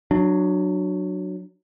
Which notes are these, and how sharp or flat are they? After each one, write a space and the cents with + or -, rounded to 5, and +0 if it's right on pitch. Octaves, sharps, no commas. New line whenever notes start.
F#3 +0 D4 +25